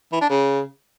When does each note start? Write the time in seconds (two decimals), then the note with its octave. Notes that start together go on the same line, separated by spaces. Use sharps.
0.12 E3
0.21 D4
0.30 C#3